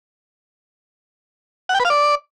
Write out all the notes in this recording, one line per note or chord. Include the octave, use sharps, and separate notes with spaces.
F#5
G5
B4
F5
D5